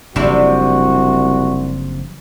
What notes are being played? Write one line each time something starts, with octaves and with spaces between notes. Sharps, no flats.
F#1 C2 C3 F3 D4 E4 F#4